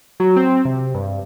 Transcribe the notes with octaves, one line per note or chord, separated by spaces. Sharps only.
F#3
C4
C3
G2